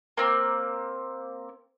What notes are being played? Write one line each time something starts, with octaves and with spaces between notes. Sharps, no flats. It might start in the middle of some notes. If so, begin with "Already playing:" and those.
A#3 C4